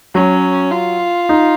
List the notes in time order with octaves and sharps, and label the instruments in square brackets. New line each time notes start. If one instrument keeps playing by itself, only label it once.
[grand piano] F#3 [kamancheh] C#4
[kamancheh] F4
[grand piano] D#4